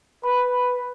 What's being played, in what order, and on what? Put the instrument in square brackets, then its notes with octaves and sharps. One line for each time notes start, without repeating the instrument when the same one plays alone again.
[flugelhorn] B4 [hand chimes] B5